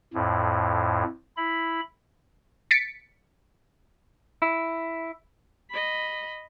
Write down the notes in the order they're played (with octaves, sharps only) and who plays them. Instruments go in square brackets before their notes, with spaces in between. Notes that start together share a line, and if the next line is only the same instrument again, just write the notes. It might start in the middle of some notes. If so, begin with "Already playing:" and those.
[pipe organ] F2 A2
E4 B5
[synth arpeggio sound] A6 B6 C#7 D7
[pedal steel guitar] E4
[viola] D#5 B5